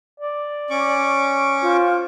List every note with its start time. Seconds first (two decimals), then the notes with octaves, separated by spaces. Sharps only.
0.20 D5
0.70 C#4 C#6 D6
1.62 F4 C5